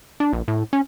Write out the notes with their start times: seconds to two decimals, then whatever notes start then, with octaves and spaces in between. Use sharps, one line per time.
0.20 D4
0.33 A#1
0.48 A2
0.73 C#4